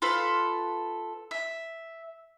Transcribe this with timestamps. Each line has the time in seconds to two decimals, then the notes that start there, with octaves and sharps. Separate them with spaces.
0.02 F4 A4 B4
1.31 E5